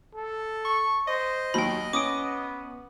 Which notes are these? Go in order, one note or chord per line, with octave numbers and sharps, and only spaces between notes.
A4
C#6
C5 D#5
D#2 F#3 G5 B5
B3 C#4 D6 D#6 D7